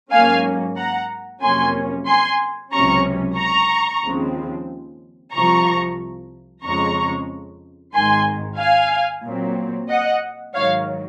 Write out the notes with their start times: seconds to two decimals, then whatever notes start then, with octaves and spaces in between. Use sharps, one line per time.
0.11 G#2 F#3 A#3 C#4 F5 G#5
0.77 F#5 A#5
1.42 F2 C3 F#3 A#3 C#4 G#5 C6
2.07 G#5 C6
2.72 C#2 C3 F#3 C#4 A#5 C#6
3.38 A#5 C#6
4.03 D#2 C#3 F3 G#3 C4
5.33 C2 C3 F3 A#5 C#6
6.63 F2 C#3 F3 G#3 A#5 C#6
7.94 G#1 G#2 D#3 G#5 C6
8.59 F5 G#5
9.24 A#2 F#3 C4
9.89 D#5 F#5
10.54 G#2 D#3 F#3 C#5 F5